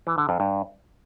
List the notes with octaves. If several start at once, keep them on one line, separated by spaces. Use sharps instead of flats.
E3
D3
F2
G2